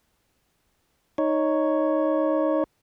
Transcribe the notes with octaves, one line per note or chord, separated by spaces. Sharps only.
D#4 C#5